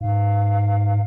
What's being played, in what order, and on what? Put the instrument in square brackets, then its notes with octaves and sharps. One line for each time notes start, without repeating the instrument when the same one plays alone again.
[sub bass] G#2 [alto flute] F5